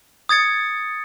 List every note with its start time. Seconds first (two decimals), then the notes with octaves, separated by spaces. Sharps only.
0.29 D#6 G#6 A6 C#7